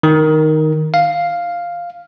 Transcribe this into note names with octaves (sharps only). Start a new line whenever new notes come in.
D#3
F5